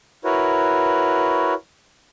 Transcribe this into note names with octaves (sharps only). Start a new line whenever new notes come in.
E4 F#4 A#4 B4 C#5